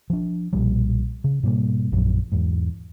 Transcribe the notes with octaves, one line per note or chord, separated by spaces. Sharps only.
F3 D4
B1 A#2 F3 G3
C#3
G#2 B2 G3 A#3
A#1 F#2 F3 F#3
E2 G#2